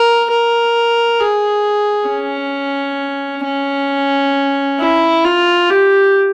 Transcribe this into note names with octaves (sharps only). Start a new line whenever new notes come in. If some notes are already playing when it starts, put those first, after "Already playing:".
Already playing: A#4
A#4
G#4
C#4
C#4
E4
F4
G4